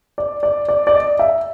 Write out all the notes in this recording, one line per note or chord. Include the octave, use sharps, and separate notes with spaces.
D5
D5
D5
D5
D#5
E5